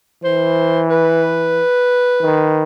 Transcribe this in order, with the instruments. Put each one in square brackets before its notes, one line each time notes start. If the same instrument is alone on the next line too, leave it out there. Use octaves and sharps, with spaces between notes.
[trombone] E3 [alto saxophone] C5
[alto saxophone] B4
[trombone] D#3